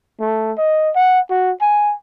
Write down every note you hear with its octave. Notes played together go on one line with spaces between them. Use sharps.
A3
D#5
F#5
F#4
G#5